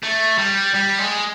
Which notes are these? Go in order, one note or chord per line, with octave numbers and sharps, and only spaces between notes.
A3
G3
G3
G#3